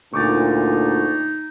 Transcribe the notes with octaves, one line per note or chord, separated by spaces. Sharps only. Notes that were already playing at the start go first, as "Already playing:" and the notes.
D2 A#2 D#4 C#6 D6 A6